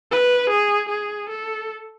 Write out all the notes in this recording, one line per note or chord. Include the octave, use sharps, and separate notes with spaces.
B4
G#4
G#4
A4